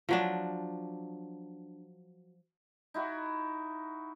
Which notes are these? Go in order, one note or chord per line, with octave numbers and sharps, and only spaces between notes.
F3 F#3 D4
D#4 E4 F#4